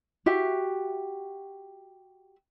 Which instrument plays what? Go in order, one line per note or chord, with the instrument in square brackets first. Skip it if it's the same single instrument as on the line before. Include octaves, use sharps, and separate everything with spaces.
[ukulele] F#4 G4 E5